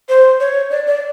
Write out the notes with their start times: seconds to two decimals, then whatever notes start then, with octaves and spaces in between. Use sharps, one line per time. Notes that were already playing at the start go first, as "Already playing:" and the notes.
0.09 C5
0.40 C#5
0.71 D5
0.87 D5